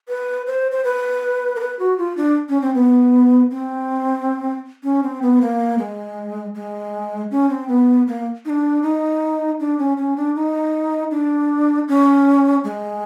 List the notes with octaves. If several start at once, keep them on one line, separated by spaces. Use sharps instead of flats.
B4
C5
C5
B4
A#4
B4
F#4
F4
D4
C#4
C4
B3
C4
C#4
C4
B3
A#3
G#3
G#3
C#4
C4
B3
A#3
D#4
D4
D#4
D4
C#4
C#4
D4
D#4
D4
C#4
G#3